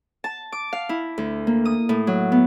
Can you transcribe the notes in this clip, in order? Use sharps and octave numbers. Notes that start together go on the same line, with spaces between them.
A5
D6
F5
E4
D2
A#3
D#6
A2
F#3
B3